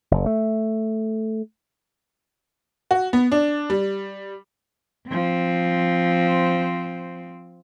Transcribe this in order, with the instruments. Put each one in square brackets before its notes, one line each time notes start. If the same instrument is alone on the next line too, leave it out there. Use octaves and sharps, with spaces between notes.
[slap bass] F#1
A3
[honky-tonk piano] F#4
B3
D4
G3
[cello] F3 C4